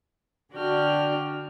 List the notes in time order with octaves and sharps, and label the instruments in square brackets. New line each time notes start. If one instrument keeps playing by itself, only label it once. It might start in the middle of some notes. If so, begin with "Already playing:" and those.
[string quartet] D3 D4 F#4 G5 F6